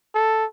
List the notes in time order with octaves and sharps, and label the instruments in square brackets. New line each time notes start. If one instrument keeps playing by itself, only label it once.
[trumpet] A4